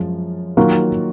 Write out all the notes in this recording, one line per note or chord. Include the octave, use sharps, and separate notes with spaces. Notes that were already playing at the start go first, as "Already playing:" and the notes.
Already playing: F#2 F3 G#3
D#3 F#3 A#3 F4 A#4